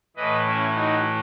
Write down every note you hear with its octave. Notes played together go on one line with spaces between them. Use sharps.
A2 E3 B4 D#5
C#4 E4
D#4 F#4